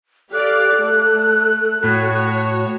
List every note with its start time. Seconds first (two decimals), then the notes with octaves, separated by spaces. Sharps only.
0.33 G4 A4 D5 F5 F#6
0.77 A3
1.84 A2 F#4 C#5